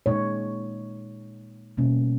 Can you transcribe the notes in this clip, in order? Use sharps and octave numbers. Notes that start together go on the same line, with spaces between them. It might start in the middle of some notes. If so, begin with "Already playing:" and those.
A#2 G#3 D#4 C#5
B2 G3 A#3 C#4